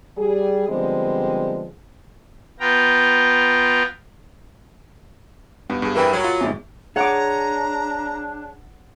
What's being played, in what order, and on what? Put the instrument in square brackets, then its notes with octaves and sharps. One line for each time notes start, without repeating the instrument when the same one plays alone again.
[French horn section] G3 G#4
D3 F3 G3 G#3 B3 C4
[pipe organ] B3 F4 G5 A#5
[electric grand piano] G2 [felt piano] B3
[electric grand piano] G2 G#4
[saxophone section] E3 [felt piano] A#4 G5 B5
[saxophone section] F#3
[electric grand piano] F4
[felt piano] G1 G#2
[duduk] D4 [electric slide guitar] G#4 C#5 [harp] F#5 D6 [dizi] A#5